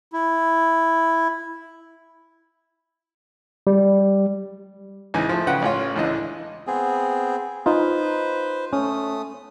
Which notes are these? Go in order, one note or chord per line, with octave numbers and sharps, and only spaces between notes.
E4
G3
C#2 E3 D#4 G#5
F3 A3
C#3 B4 F#5 G5
A1 C#4 F4
C#2 A2 E3 D4 D#5
B3 C4 G#4
D#4 F4 B4 C5
A3 C#4 D#6